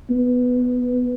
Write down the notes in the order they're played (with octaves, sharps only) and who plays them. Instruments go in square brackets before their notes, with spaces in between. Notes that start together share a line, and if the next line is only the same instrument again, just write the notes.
[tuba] B3